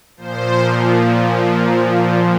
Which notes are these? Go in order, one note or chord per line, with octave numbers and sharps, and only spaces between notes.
A#2 F3 C5
A#4
C5